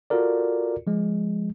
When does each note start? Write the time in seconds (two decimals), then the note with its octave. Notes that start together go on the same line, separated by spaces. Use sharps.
0.10 F4 F#4 A4 A#4 D5
0.87 F3 G#3